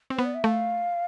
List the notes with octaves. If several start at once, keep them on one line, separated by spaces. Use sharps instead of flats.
C4
B3 C5
D5
E5
A3 F5